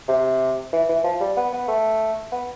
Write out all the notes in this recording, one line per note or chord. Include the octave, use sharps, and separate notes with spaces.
C3
E3
E3
F3
G3
B3
B3
A3
B3